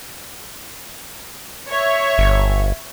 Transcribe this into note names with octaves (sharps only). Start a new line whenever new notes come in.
C#5 E5
G1